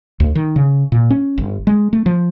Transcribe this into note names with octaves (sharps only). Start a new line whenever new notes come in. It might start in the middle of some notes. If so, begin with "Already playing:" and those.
D2
D#3
C#3
A#2
C#4
G1
G#3
A3
F3